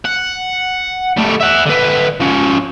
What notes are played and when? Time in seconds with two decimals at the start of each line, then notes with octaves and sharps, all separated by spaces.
0.05 F#5
1.17 G3 A3
1.41 E5 F#5
1.66 D3 B4
2.20 F3 C#4